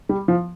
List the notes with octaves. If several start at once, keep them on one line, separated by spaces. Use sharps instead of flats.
G3
F3